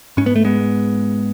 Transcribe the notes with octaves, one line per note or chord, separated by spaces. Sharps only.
G#2 C#4
B3
A3
G#3 B3